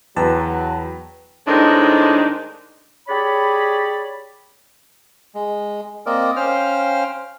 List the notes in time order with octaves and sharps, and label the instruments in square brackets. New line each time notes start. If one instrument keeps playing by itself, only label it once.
[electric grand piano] E2 [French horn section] F#3 [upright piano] B4 G5 A#5 [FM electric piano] A5
[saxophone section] A2 D#3 G#3 C4 D4 D#4
[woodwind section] G4 G#4 C#5 D5 B5
[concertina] G#3
A#3 C4 A#4 D5 D#5
C#4 C5 F5 G5 F6